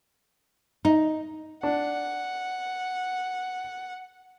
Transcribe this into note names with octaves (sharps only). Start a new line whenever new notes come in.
D#4
D4 F#5